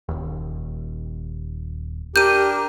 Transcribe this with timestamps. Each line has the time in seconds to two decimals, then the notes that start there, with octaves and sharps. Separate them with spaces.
0.09 D#1 G#1 D#2
2.16 D4 G4 A#4 G6 D#7